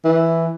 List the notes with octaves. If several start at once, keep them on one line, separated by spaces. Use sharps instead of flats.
E3